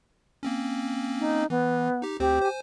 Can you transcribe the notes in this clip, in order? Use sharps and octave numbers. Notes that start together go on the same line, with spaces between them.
A#3 C4 C#4
D#4
E3 B3
D#4 G4
D2 C4 G4 C5
C5 G#5